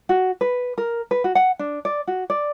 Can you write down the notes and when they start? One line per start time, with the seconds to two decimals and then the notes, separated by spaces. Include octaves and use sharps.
0.09 F#4
0.41 B4
0.78 A#4
1.11 B4
1.24 F#4
1.35 F#5
1.59 D4
1.85 D5
2.07 F#4
2.30 D5